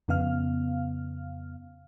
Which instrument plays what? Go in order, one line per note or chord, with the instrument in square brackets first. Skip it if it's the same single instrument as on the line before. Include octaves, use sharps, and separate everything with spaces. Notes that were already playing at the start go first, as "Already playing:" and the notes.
[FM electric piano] F2 C#3 B3 F5 F6